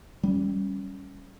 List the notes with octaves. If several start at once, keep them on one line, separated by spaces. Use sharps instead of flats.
G3 C#4